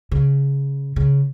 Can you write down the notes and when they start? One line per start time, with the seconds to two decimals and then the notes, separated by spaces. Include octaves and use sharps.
0.12 C#3
0.96 C#3